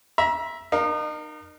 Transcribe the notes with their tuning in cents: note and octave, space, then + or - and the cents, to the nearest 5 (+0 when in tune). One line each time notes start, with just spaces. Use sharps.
E5 +0 A#5 +35
D#4 -35 A#4 +15 F5 +0